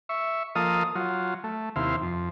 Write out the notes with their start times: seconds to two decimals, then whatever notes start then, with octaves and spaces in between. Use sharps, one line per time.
0.09 E5 C#6
0.55 F3 A#3 A4 D#5 F5 D#6
0.95 F#3 F4
1.44 A3
1.76 D#2 C3 E4 F5 C6
2.02 F2